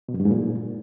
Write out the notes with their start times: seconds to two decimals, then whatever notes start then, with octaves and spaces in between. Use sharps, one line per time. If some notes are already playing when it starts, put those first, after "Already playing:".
0.09 B2
0.14 F#2
0.20 G2
0.25 G#2
0.31 A#2